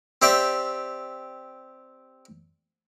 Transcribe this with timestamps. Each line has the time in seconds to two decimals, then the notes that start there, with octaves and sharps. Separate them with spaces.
0.22 C4 G4 D5 E5 G5